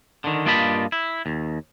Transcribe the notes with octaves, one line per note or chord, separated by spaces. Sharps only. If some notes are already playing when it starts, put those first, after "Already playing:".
D3 D#3
G2 A#3 F4 D#5 A5 B5
E4
D#2